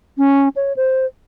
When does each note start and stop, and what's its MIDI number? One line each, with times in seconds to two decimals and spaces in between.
0.18 0.49 61
0.56 0.73 73
0.76 1.06 72